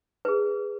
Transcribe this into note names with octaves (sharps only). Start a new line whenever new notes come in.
G#4 B4